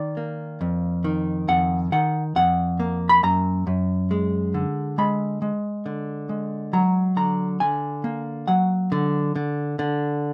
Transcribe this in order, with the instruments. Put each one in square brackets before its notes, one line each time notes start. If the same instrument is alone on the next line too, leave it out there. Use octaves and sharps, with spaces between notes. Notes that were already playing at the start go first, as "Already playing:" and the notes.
Already playing: [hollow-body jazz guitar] D#3 D5
A#3
F2
D#3
F2 F#5
D#3 F#5
F2 F#5
A#3
B5
F#2 A#5
F#2
G#3
D3
G#3 B5
G#3
D3
G#3
F#3 A#5
D3 A#5
D3 G#5
A#3
F#3 F#5
D3
D3
D3